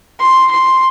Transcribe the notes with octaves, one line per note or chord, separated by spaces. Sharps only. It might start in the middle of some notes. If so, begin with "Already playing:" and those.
C6
C6